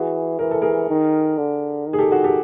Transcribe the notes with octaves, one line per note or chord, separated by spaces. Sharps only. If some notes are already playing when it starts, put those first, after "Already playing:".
Already playing: E3 F#4 G#4
E3 A#4
A4
G#4 A#4
D#3
D3
D#3
G#4
G4 A4
F#4 G#4
G4 A4